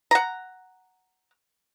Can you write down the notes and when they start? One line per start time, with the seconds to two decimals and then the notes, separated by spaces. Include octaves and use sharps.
0.11 F#5 A#5